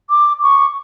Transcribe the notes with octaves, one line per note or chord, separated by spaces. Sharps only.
D6
C#6